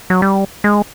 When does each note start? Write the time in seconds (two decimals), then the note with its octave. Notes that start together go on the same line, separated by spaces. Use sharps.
0.10 F#3
0.22 G3
0.64 G#3